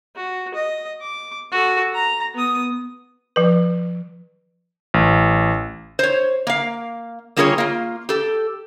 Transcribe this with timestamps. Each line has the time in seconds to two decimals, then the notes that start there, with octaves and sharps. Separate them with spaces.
0.16 F#4
0.55 D#5
1.01 D6
1.52 F#4 A4
1.95 A#5
2.34 B3 D#6
3.36 F3 B4
4.94 A1
5.99 C5 C#5
6.47 A#3 F5
7.36 G3 A#3 F4 G#4 A#4 C#5
7.58 A#3 F4
8.09 G4 A4